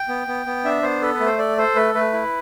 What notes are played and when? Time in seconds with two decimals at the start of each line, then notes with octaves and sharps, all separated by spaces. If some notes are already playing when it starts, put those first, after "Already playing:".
Already playing: G5
0.08 B3
0.27 B3
0.46 B3
0.65 D4 E5
0.82 B3 C5
1.02 A4 B4
1.14 B4
1.20 A3
1.26 C5
1.38 A4 D5
1.57 A4 C5
1.76 A3 B4
1.94 A3 B4
2.13 E4